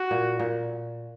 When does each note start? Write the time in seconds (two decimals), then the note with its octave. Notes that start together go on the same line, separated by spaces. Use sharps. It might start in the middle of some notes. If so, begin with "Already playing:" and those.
Already playing: F#4
0.11 A#2
0.40 A#2